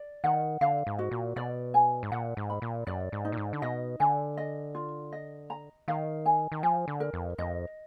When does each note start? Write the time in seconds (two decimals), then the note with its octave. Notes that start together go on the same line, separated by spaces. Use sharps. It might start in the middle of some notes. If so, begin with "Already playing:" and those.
Already playing: D5
0.24 D#3 F#5
0.61 D3 F5
0.87 G#2
0.99 F#4
1.11 A#2
1.36 B2 D5
1.74 G#5
2.03 G#2
2.12 A#2 F#5
2.37 G#2
2.50 B5
2.62 A#2
2.87 F#2 D5
3.12 G#2
3.25 D#4
3.32 A#2
3.37 G#2
3.53 D3
3.62 B2 D#5
4.00 D3 G#5
4.37 D#5
4.75 F4
5.13 D#5
5.50 A#5
5.88 D#3 F5
6.26 G#5
6.52 D#3
6.63 F3 G#5
6.88 D3
7.00 A#4
7.13 F2
7.38 F2 D#5